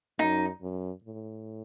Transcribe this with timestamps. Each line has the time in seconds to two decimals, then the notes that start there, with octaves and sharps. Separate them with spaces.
0.19 F#2 D#4
0.62 F#2
1.04 A2